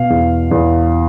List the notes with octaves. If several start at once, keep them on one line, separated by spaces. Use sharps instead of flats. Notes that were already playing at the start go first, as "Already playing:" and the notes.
Already playing: B2 F5
E2
E2